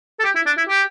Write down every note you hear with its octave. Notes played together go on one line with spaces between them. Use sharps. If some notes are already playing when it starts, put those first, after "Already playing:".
A4
G4
E4
D4
E4
G4